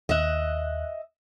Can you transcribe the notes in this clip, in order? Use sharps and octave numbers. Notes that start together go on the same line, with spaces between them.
D#2 D#5 E5 F#6